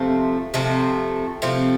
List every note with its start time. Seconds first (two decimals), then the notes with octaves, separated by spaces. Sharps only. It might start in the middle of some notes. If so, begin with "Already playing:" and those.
Already playing: C3 F3 A3 C4
0.54 C3 F3 A3 C4
1.42 C3 F3 A3 C4